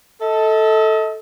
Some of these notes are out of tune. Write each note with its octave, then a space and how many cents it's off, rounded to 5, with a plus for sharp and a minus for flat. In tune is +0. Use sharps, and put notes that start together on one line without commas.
A4 +0 D#5 +40